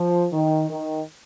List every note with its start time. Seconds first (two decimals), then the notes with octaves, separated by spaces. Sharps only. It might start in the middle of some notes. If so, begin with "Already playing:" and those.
Already playing: F3
0.32 D#3
0.68 D#3